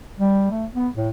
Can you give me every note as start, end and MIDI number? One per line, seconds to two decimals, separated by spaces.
0.19 0.46 55
0.51 0.65 57
0.75 0.88 59
0.95 1.09 45